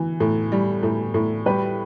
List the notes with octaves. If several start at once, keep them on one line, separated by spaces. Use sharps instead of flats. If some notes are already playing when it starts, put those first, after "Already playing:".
Already playing: E3
A2
G3
A2
A2
G3 G4 B4